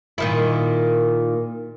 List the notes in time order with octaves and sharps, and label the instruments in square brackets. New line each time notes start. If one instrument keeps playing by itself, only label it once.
[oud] A#2 D#3 E4